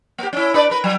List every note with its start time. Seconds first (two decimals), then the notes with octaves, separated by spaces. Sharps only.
0.18 A#3 G4
0.33 C#4 E4
0.54 D4 B4 D5
0.70 A#4 B4
0.84 F#3